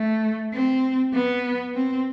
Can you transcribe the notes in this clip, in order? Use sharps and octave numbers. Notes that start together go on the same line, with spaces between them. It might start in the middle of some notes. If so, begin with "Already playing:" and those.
Already playing: A3
C4
B3
C4